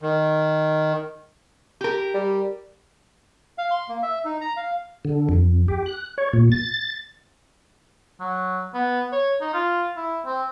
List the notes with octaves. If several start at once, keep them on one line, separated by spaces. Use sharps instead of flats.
D#3
G4 A#4
G3
F5
C6
A#3
E5
D#4
A#5
F5
D3
F2
G4
F#6
C#5
A#2
A6
F#3
B3
C#5
D#4
F4
E4
C4